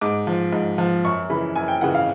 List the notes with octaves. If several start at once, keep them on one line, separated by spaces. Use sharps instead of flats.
G#2 D6
F3
G#2
F3
F#2 C#6
C#3 E3 B5
F#2 G#5
G5
C#3 E3 F#5
F5